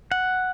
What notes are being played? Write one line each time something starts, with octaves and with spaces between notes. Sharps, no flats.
F#5